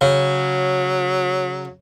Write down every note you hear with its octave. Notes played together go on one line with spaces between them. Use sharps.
C#3 F#3